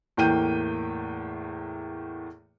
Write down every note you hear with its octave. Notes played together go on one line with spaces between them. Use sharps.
E2 A2 A#3 G5 G6 D#7